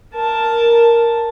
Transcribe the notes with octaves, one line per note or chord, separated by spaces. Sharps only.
A#4 A5